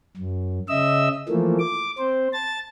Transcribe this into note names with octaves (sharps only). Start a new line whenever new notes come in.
F#2
C#3 D#5 E5 E6
E3 F3 A3 A#3
D6
C4 C5
A5 A6